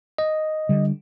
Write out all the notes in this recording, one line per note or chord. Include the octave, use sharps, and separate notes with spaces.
D#5
D3 G3